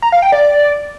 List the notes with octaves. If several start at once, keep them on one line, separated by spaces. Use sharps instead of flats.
A#5
F5
G5
D5